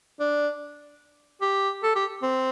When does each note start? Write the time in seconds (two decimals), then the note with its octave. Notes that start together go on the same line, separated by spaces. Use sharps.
0.20 D4
1.41 G4
1.83 A4
1.95 G4
2.23 C4